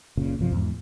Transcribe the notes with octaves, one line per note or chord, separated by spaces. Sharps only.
F#1 A#2 C#3
A1 G2 C3 F3
E2 G#2